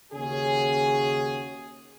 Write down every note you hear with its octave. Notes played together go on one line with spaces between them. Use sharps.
D#2 C#3 C#4 F#4 G#4